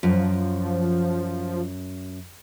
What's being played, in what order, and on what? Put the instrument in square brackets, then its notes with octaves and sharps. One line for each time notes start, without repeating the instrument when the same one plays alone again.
[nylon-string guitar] F#2 [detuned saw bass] F3